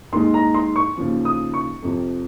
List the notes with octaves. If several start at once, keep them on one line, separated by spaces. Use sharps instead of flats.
D#2 D#3 G#3 C6
A#5
C6
C#6
D#2 C#3 F3
D#6
C#6
F2 C3 F3